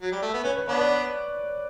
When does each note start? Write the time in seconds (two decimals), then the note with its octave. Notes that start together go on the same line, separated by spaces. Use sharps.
0.02 F#3
0.12 G3
0.22 A3
0.34 B3
0.44 C#4 B4
0.57 B4
0.68 B3 D4 C#5
0.80 D5